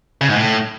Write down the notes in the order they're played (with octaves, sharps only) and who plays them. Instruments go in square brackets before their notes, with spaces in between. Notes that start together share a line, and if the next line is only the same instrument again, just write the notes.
[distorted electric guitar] C#3
G#2
A2